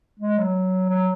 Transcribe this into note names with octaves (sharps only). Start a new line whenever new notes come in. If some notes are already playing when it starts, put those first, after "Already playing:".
G#3
F#3
F#3